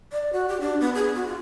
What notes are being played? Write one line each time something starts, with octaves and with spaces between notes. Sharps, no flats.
D5
F#4
G4
D4
B3
G#4
F#4
F4